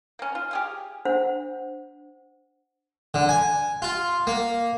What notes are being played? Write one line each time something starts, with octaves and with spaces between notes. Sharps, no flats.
A#3 C#4
F4
G4 G#4 F5
D4 C5 F#5
D3
G#5
F4
A#3